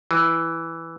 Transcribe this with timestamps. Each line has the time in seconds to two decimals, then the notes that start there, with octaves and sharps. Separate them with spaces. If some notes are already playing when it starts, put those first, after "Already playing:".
0.11 E3